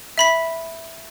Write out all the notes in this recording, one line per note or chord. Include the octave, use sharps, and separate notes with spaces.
E5 B5 B6